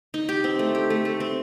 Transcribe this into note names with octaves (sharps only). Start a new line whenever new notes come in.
D#4
G4
C4
A3
G4
A3
A3
C4